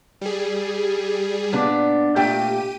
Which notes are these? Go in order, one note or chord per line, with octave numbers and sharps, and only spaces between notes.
G3 G#4
A#2 B3 D4
A#2 A3 G4 G5 D#7